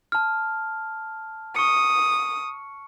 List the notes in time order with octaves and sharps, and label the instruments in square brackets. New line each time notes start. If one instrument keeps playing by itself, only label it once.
[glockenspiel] A5 F6
[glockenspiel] C#6 C#7 [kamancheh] D#6